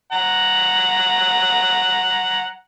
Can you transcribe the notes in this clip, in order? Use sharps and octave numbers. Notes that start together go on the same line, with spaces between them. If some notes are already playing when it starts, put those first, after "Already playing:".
F#5 A#5